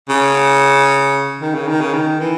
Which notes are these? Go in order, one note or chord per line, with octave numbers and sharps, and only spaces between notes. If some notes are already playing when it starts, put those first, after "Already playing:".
C#3
D#3
C#3
D#3
C#3
D#3
E3